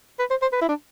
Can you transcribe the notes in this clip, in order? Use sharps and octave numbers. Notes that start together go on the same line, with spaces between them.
B4
C5
C5
B4
E4
D4